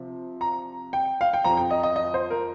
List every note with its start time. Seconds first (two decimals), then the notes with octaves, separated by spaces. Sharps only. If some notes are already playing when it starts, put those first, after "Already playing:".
Already playing: C3 F3
0.41 A#5
0.93 G5
1.21 F5
1.34 G5
1.44 F2 F3 A#5
1.57 G5
1.70 D#5
1.83 D#5
1.96 D#5
2.14 C5
2.30 A#4